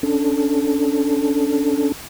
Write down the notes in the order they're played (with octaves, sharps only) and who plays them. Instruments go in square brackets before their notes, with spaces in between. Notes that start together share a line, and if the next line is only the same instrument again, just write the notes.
[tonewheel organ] C#4 D4 A4